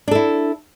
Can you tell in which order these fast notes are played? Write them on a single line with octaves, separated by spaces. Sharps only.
D4 A4 E4